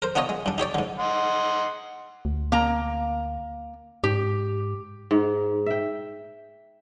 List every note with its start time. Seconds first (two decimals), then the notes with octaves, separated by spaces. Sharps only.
0.02 A#4 C5
0.15 B3 D4 F4 C#5 D#5
0.29 G#3
0.46 G2 D4
0.58 D#4 G4 C#5 D5
0.74 G#2 D3
0.99 D#5 F#5 C6
2.25 D2
2.52 A#3 A#5
4.04 G#2 G4
5.11 G#2
5.66 E5 G5